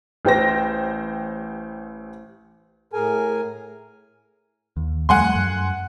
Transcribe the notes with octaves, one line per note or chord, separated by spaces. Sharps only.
A1 G4 C5 A#6
A2 G#4 A#4 G#5
D#2
F2 G3 A3 F#5 G#5 C6
F#2